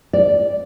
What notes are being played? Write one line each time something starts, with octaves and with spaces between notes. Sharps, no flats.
D5